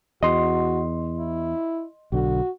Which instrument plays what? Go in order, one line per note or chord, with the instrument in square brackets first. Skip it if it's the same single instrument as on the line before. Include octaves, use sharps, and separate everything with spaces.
[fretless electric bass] E2 [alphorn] F#4 [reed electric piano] D#5 C6
[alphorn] E4
[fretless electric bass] B1 D3 [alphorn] F#4